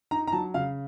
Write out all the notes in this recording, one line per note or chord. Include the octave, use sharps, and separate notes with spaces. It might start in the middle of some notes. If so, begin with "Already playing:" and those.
D#4 A#5
A#5
F#3 A5
C#3 F5